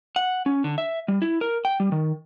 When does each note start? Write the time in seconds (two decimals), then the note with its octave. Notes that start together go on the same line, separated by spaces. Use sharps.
0.16 F#5
0.46 C#4
0.64 D3
0.78 E5
1.08 G3
1.22 E4
1.41 A#4
1.65 G5
1.80 G3
1.92 D#3